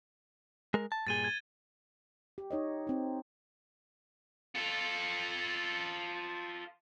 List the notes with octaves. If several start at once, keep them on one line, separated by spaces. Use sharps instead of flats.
G#3 A#4
A5
G2 A#2 G#4 A6 D#7 G7
G#6
G4
D#4 C#5 D#5
C4 D#4
F4 A4